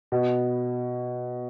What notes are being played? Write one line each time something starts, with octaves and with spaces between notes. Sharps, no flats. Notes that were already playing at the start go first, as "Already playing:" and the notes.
B2